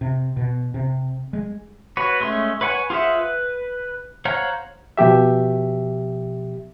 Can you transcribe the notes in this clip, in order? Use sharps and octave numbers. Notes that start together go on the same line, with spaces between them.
C3
B2
C3
G#3
F#4 B4 C#5
G#3 A3 C#4 C6
B4 C#5 F#5 G#5
F4 G#4 C5 E5 F#5
B4
C5 C#5 F5 F#5 A#5
B2 F3 G4 E5